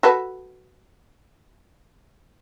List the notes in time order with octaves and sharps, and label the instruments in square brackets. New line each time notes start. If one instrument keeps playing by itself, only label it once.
[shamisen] F#4 A4 B4